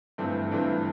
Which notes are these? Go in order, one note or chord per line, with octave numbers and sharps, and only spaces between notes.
G1 G2 E3 A3 C4
G1 G2 E3 A3 C4